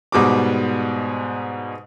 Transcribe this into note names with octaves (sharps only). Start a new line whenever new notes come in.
G#2 B2 G3 D6